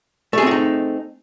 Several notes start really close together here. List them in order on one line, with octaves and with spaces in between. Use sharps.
A3 G#4 C4 F#4 D#4